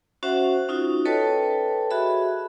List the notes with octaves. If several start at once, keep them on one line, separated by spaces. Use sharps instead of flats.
C#4 F#4 C5 E5 F#5
C#4 D#4 F4 F#4
A4 B4 C#5 D#5 G5 A5
F#4 G#4 E5 B5